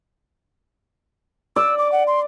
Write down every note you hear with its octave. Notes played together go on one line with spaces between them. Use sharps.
D5 E6
D6
F#5
C6